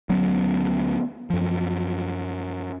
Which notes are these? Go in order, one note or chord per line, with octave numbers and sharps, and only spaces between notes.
D2 F#3 B3 C#4
F#2 F3